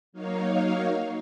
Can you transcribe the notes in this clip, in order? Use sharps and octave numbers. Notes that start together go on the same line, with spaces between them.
F#3 A#3 D#4 C#5 F5